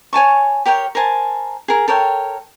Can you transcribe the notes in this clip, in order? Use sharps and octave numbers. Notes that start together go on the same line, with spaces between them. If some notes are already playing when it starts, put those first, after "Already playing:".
C#5 G#5 A5 C#6
G4 A#4 C#5 G5
A#4 C5 G#5 A5
G#4 A#4
A4 A#4 C#5 G5